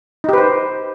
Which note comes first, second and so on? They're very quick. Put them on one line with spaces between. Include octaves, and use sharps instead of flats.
D#4 G4 B4 C5